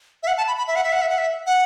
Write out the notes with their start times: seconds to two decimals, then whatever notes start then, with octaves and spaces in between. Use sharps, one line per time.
0.23 E5
0.27 F#5
0.37 A5
0.47 B5
0.58 B5
0.68 E5
0.76 F#5
0.84 E5
0.92 F#5
1.01 E5
1.09 F#5
1.18 E5
1.46 F#5